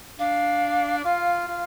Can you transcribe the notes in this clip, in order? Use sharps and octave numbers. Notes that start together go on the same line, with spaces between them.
D4 F5
F4 F5
F4